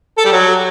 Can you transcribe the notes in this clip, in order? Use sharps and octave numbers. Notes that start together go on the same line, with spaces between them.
A4
G3
F#3